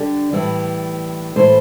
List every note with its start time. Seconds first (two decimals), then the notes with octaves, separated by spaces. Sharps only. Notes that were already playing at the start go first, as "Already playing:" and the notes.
Already playing: D3 G3
0.33 A2 E3 G3
1.36 A2 E3 A3 C5